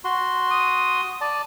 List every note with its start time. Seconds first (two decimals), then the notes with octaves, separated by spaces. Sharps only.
0.04 F#4 C6
0.51 D#6
1.21 D5 A5